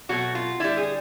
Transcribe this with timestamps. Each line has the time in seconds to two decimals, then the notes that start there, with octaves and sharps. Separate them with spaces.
0.09 B2 F#3 A3 F#4
0.35 F4
0.60 D3 G3 E4
0.77 G#4